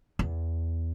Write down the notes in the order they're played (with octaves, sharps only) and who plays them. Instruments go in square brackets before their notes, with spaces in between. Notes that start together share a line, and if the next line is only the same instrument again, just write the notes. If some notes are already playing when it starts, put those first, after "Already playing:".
[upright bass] E2